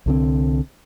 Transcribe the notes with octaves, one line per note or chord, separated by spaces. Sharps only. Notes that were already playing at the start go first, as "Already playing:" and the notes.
C2 D3 C4